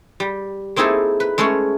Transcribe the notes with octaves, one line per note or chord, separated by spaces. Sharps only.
G3
A#3 C4 D#4 E4 G#4 A4
B4
G#3 A3 C#4 G#4 C#5